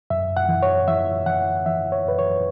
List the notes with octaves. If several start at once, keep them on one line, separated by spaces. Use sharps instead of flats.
F#2 E5
F#5
E3
C#5
E3 E5
E3 F#5
E3 E5
C#5
F#2 B4
C#5